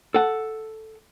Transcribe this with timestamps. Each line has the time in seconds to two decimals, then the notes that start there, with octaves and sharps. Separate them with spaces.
0.14 A4 F#5